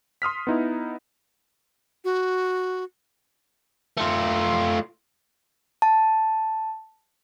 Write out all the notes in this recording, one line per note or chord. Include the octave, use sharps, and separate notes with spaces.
C6 D#6 F6 B6
B3 D#4 E4
F#4
A3 F4
A5